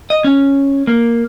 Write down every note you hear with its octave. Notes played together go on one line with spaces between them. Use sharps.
D#5
C#4
A#3